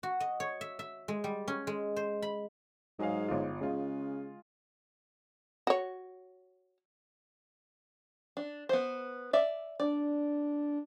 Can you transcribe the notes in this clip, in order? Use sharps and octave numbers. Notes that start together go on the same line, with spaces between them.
F#4
D#5
C#5
E5
E5
G#3
G3
C#4
G#3
C5
B5
G#2 F#3 G#4 F5
G1 F4
C#3 G#3 F4
F#4 C#5
D4
B3 C5
D5 E5
D4 D5